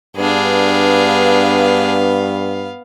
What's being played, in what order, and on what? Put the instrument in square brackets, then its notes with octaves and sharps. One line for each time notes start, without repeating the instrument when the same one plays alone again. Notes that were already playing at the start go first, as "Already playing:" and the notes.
[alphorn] G2 [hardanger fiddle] B3 F5 [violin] D4 G#4